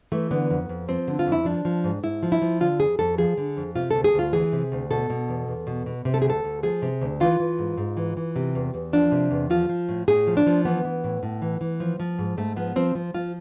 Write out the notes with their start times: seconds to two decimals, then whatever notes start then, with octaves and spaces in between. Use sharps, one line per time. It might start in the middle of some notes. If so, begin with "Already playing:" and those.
0.12 E3 A3
0.31 D3 B3
0.50 F2
0.69 F2
0.88 F3 C4
1.08 D3
1.19 F4
1.27 F2
1.32 E4
1.45 F3 D4
1.65 F3
1.84 G#2
2.03 G#2 E4
2.23 F3
2.32 E4
2.42 F3
2.60 D3 F4
2.80 F2 G#4
2.99 F2 A4
3.18 F3 G#4
3.37 D3
3.57 F2
3.75 C3 F4
3.91 D2 A4
4.04 G#4
4.14 D2 F4
4.33 E3 G#4
4.53 C3
4.72 D2
4.90 B2 A4
5.10 B2
5.28 E2
5.48 E2
5.67 B2
5.86 B2
6.05 C3
6.14 A4
6.22 G#4
6.25 D2
6.30 A4
6.44 D2
6.63 F3 G#4
6.82 C3
7.02 D2
7.20 E3 F4
7.40 E3
7.59 G#2
7.77 G#2
7.97 E3
8.17 E3
8.36 C3
8.55 E2
8.74 E2
8.93 F3 D4
9.12 C3
9.31 E2
9.50 F3 F4
9.69 F3
9.89 A2
10.08 A2 G#4
10.27 F3
10.37 D4
10.46 F3
10.65 E3 B3
10.85 E3
11.04 A2
11.23 A2
11.42 E3
11.61 E3
11.80 F3
12.00 F3
12.19 G#2
12.37 G#2 A3
12.56 F3 B3
12.76 F3 C4
12.95 F3
13.14 F3 F4